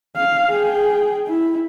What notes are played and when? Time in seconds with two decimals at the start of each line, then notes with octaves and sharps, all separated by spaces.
0.16 F5
0.51 G#4 G5
1.27 E4